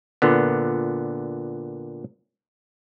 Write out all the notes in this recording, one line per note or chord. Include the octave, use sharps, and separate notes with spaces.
A#2 D3 B3